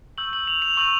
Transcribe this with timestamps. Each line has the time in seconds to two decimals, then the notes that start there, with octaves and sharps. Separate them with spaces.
0.18 C#6 E6 G6 F#7
0.33 F#7
0.47 F7
0.62 F7
0.77 C#6 E6 G6 F#7